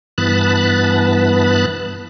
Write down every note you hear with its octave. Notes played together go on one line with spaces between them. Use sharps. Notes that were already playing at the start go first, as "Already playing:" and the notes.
G2 E3 B3 A5 B5 F#6